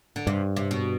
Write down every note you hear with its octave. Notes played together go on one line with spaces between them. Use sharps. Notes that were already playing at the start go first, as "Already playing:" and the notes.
D3
G2 C3
C3
B2